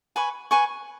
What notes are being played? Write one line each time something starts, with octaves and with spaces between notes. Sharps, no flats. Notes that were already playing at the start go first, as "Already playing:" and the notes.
B4 G#5 C#6
B4 G#5 C#6